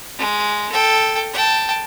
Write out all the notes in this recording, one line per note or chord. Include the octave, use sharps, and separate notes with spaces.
G#3
A4 G5
G5 A5